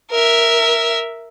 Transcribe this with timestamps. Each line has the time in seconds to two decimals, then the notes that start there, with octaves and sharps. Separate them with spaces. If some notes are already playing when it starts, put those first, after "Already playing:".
0.11 A#4 E5